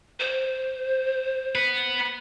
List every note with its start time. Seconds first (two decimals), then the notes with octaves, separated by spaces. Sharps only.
0.20 C5
1.55 B3 B4